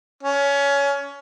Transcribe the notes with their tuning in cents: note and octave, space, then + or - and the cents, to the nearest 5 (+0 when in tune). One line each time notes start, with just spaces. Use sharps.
C#4 +20